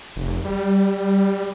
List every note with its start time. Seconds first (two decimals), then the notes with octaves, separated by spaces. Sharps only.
0.16 F1
0.45 G3